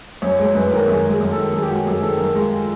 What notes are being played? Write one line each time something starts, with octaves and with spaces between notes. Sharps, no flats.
F#2 C#5
G#3 C#5
F#2 B4
D#3 A#4
F#2 G#4
G#3
G#4
F#2
A4
D#3
F#2 G#4
G4
G#3 F#4
F#2 G#4
D#3 A4
F#2 A#4
G#3
F4